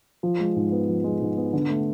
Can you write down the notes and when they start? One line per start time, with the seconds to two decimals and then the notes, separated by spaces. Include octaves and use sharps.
0.23 F3
0.40 G#3
0.56 G#2
0.72 B3
0.89 F3
1.04 G#3
1.21 G#2
1.37 B3
1.53 D3
1.70 A3